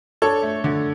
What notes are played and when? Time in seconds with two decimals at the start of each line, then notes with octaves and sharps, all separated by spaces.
0.22 D4 A4 C#5
0.42 A3
0.64 D3